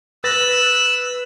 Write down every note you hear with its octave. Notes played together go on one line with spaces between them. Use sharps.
B4 E6 F#6 A6 A#6